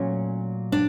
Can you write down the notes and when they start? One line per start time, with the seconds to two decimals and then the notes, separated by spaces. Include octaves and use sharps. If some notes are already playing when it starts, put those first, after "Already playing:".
Already playing: A#2 F#3 A3 C#4
0.72 D4